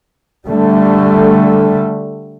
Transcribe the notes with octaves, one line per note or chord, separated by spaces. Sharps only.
D3 G3 A3